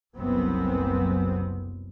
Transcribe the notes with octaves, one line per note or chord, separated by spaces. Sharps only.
F#1 C2 F#2 B3 C4